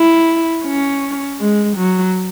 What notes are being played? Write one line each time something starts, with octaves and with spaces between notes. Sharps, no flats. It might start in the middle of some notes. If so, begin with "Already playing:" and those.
Already playing: E4
C#4
G#3
F#3